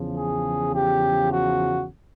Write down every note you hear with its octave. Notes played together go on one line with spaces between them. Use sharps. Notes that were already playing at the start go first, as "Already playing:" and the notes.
Already playing: E2 C#3 F3
G#4
G4
F#4